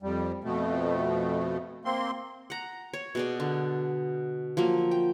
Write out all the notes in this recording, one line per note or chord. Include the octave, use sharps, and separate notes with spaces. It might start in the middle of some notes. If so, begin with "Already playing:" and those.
F2 G3
F2 B2 A3
A#3 C4 C6
F#5 A#5
C#5
B2 G#4 D5
D3
F3 F#3 A#3
G5